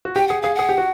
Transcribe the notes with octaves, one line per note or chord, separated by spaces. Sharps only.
F#4
G4 G5
G#4 F#5
G#4 F5
G#4 F#5
G4
F#4